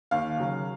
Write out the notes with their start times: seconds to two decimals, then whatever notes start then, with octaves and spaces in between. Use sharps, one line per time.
0.11 D#2 F5
0.38 C#3 F#3